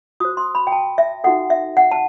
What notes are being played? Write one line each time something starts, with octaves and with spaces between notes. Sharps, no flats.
F#4 C5 D#6
C6
B5
G5
A5
E5
D#4 F#4 A4 F#5
E5
F#5
A5